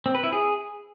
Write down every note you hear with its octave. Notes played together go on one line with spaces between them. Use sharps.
C4
B4
E4
G#4